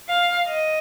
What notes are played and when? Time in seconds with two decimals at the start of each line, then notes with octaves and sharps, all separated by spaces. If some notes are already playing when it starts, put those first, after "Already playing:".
0.09 F5
0.47 D#5